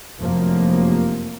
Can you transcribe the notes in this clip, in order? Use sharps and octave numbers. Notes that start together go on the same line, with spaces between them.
F1 F#2 F3 A#3